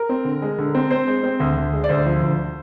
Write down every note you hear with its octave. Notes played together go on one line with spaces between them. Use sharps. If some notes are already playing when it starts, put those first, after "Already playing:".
Already playing: A#4
C4
D3
G#3
D3
C4
C4 C5
G#3
C4
D2
D2
G#3
D5
D2 C5
F3
D2